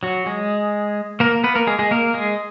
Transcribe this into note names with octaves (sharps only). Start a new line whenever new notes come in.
F#3 F#4
G#3 G#4
A#3 A#4
B3 B4
A#3 A#4
G#3 G#4
G#3 G#4
A#3 A#4
G#3 G#4